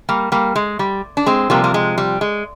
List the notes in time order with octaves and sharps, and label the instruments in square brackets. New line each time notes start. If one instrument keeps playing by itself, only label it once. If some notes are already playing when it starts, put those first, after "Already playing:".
[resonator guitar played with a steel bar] G3 A#3
G3 A#3
G#3
G3
D4
G#3 C4
C3 F3 G3 A#3
A#3
G#3
G3
G#3